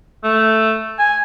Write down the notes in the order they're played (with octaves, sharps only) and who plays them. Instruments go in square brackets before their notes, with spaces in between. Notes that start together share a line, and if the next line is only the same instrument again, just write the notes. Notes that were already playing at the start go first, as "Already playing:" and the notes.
[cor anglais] A3
G#5